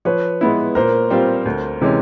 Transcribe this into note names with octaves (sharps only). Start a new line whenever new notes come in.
F3 B4 C#5
G#3 B3 E4
A#2 A#4 C5
G3 C4 F4
D2
C3 E3 G#3 C#4